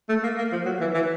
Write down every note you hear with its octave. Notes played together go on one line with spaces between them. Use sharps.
A3
A#3
A#3
F3
F#3
E3
E3